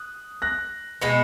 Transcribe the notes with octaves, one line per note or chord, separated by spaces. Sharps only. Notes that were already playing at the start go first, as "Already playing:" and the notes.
Already playing: D#6 F#6
F#6 A#6
B2 G#3 B3 A#6 C#7